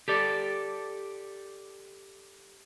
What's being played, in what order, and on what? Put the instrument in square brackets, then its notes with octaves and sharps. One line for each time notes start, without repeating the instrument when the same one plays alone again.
[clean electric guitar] G4 A4 D5